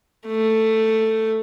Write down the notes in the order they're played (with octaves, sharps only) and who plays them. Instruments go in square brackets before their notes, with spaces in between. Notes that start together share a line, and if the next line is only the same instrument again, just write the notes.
[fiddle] A3